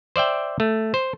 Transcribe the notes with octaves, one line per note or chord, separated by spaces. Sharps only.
C5 D5 E5 G5
A3
C5